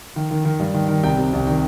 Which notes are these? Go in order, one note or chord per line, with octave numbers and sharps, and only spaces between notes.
D#3
D#3
D#3
G2
D#3
D#3
C2 G5
C3
C2
D#3